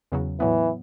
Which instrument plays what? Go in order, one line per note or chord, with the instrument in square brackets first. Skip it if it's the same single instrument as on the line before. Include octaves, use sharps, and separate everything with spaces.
[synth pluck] E2 C#3 F#3
[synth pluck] A2 F#3 B3 [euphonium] E3